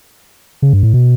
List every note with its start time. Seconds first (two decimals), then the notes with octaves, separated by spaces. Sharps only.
0.62 C#3
0.73 G2
0.83 A2
0.94 B2